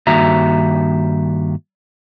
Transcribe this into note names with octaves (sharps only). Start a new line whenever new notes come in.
G2 D#3 A#3 F#4 E5 A#5